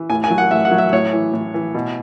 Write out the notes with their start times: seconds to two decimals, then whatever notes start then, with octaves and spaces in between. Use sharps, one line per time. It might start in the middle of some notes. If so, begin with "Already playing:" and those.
Already playing: E3
0.10 A2 G#5
0.24 G#5
0.30 F#3
0.38 F#5
0.51 A2 E5
0.65 F#5
0.72 F#3
0.78 E5
0.92 A2 C#5
1.13 E3
1.33 A2
1.54 E3
1.75 B2